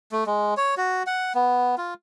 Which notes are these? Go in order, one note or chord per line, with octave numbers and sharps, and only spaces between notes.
A3
G#3
C#5
F#4
F#5
B3
F4